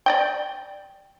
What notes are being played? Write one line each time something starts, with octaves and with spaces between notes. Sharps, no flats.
D5 D#5 G5